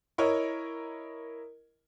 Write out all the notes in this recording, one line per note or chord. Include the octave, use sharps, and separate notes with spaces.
E4 A#4 C#5 D#5